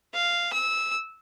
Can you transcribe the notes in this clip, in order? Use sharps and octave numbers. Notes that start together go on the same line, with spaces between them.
F5
E6